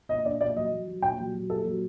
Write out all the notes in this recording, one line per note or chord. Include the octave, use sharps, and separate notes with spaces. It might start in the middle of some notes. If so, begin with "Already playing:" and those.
A#2 D#5
D4 D5
A#2 D5
F#3 D#5
F#3
F#3
A#2 G5
F#3
F#3
A#2 A4
F#3